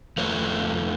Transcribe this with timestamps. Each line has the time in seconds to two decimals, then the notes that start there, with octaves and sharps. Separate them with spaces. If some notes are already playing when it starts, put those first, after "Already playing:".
0.17 F2 A3 B4 C#5